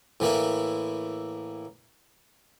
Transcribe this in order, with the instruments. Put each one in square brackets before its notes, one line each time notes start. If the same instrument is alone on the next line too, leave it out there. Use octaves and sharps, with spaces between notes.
[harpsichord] A2 E3 A#3 E4